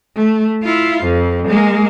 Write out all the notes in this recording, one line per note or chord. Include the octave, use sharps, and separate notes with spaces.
A3
E4 F4
F2
G#3 A#3